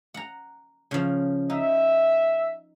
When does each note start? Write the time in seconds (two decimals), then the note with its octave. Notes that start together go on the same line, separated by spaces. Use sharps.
0.14 F#5 A#5
0.91 C#3 F3
1.50 D#4 E5